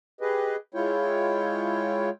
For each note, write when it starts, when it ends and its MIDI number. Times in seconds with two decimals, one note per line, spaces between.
0.21 0.56 67
0.21 0.56 68
0.21 0.56 71
0.21 0.56 75
0.74 2.09 56
0.74 2.09 64
0.74 2.09 65
0.74 2.09 73
0.74 2.09 79